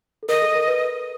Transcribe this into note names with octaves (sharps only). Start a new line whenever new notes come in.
A4
A#4 D#5
A4
A#4
B4